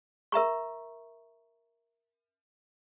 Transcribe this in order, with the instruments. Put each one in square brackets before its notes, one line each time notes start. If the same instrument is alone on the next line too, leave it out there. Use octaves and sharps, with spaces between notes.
[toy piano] A#4 E5 A#5 C#6